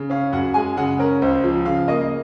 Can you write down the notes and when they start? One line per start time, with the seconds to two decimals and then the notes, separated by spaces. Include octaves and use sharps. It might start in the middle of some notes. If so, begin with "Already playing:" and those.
Already playing: C#3
0.10 C#4 F5
0.32 F#2 F#5
0.54 G#3 G#5
0.77 C#3 F#5
0.99 C#4 A#4
1.22 C#2 C5
1.44 F3
1.66 C#3 F5
1.88 A#3 D#5